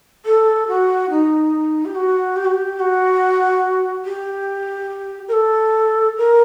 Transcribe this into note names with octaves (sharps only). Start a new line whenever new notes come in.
A4
F#4
D#4
G4
F#4
G4
F#4
G4
F#4
G4
A#4
A4
A#4